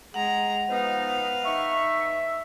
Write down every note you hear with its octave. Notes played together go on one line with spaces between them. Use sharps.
G#3 F#5 A#5
F3 B3 D#4 B4 F5
D#4 E5 C#6